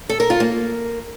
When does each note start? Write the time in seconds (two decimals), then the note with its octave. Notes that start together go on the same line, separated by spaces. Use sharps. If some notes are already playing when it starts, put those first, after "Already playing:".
0.09 A4
0.20 A#4
0.30 F4
0.40 A#3